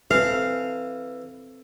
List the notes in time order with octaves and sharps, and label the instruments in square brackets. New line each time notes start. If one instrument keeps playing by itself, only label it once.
[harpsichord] E3 [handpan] C4 A4 [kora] F5